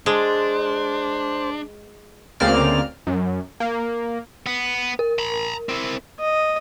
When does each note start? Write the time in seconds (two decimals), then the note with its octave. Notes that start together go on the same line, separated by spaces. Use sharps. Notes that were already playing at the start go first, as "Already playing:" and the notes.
0.06 G#3 D4 C5
2.40 D2 C#3 A#3 C4 D5 F6
3.07 F#2
3.60 A#3
4.46 B3
4.99 A#4
5.19 A#5 B5
5.69 C4 E4
6.20 D#5